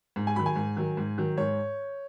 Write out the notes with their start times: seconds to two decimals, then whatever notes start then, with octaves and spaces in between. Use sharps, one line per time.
0.16 G#2
0.27 G#5
0.36 D#3 F#3 B5
0.46 G#5
0.56 G#2
0.77 D#3 F#3
0.97 G#2
1.18 D#3 F#3
1.37 G#2 C#5